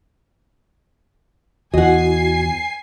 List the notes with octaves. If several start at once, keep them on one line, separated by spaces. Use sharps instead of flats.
E2 E4 F#4 D#5 F#5 G#5 C7